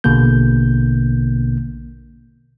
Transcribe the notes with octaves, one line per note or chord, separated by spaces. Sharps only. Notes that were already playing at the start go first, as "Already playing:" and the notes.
A#1 B2 D3 A#3 G6